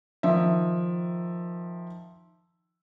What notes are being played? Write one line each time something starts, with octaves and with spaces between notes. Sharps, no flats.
D#3 F3 E5